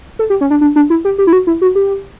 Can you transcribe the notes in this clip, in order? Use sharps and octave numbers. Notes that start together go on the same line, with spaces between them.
A4
G4
C#4
D4
D4
D4
E4
G4
G4
E4
F#4
E4
F#4
G4